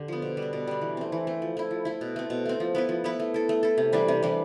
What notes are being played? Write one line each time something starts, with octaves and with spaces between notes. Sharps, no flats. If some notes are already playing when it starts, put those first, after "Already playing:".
Already playing: D3 G4
F3 B3
B2
G3
D4
B2
G3 D4
E3
A3 C4
E3
A3 C4
F3
A3 E4
F3
A3 E4
B2
A3 C4
B2
A3 C4
F3
B3 E4 B4
F3
B3 E4 B4
A3
E4 A4
A3
E4 A4
C3
E3 G3 D4
C3
E3 G3 D4